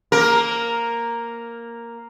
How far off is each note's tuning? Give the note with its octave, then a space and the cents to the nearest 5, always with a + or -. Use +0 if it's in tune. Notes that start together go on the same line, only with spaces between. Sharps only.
A#3 +0 A#4 +0